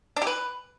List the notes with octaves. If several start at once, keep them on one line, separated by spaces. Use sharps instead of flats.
D4
G4
B4